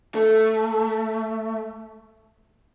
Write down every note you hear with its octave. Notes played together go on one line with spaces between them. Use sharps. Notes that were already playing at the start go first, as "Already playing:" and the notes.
A3